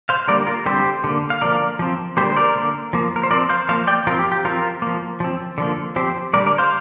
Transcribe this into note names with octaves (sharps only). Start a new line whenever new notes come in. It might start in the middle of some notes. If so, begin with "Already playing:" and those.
C5 F5
D3 G3 A#3 A#4 D5
F4 A#4
D3 G3 C4 G4 C5
D3 A#3
F5
D3 F3 A#3 A#4 D5
F3 C4
D3 G3 A#3 G4 C5
C5
A#4 D5
D3 A#3
F3 A#3
A#4
C5
F3 C4 A#4 D5
C5 F5
F3 A#3 C5 F5
D5 G5
F3 C4 F4 A#4
G4
G4
F3 C4 F4 A#4
F3 A#3
F3 C4
D3 F3 A#3
F3 C4 G4 C5
D3 G3 A#3 A#4 D5
A#4 D5
C5 F5